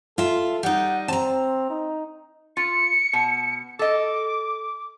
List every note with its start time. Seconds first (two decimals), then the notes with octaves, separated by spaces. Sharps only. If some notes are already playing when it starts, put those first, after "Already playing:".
0.18 F4 A4 E5
0.63 G3 D#4 F#5
1.08 C4 A5 A#5
1.70 D#4
2.57 F4 C#7
3.13 B2
3.79 A4 D#5 D6